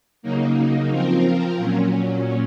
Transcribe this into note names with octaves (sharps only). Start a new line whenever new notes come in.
C#3 F#3 A#3 D#4
F3 C4 F4 A#4
A#2 F#3 C#4